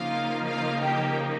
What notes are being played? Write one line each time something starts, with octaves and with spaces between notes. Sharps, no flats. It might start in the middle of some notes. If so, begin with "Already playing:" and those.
Already playing: C#3 F3 A#3 D#4 F4 F5
F4 F5
G4 G5